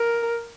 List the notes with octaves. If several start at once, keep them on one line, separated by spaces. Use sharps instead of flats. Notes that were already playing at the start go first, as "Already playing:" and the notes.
Already playing: A#4